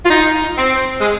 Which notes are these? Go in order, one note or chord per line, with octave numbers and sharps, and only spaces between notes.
F4
D#4
C4
G#3